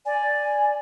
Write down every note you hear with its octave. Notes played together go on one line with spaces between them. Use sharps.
D5 G#5